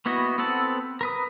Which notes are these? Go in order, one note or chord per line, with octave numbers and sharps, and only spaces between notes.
A#3 B3 E4 F#4 D#5
B3 C4 A4 F#5 A5
A#4 B4 D#6